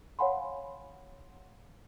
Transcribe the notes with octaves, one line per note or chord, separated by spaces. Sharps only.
C#5 F5 F#5 G#5 B5 C6